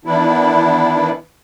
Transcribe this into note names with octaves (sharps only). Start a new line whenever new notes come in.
D#3 E3 B3 D4 E4